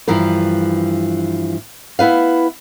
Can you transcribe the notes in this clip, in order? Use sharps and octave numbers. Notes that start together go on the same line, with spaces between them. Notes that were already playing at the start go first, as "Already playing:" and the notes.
G2 E3 F3 A#4
B3 E4 B4 F5